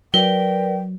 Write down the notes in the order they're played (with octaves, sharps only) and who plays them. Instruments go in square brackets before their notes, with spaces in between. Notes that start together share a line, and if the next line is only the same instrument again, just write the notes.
[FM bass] F#3 [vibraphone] A#4 B4 D5 [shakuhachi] G5 [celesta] G7